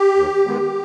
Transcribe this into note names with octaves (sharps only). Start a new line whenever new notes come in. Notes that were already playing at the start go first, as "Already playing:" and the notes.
Already playing: G4
D#2
D#3 G#3 B3